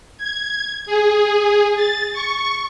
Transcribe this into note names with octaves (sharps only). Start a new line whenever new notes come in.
G#6
G#4
A6
C#6